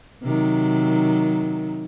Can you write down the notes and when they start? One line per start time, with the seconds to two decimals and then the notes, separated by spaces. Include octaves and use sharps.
0.23 C3 D#3 F#3